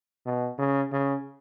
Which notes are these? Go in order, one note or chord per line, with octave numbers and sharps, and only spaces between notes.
B2
C#3
C#3